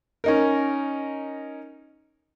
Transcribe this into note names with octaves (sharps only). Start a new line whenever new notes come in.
C#4 D#4 A#4